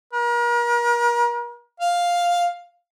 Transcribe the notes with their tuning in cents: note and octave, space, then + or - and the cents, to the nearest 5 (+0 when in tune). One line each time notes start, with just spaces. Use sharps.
A#4 +40
F5 +5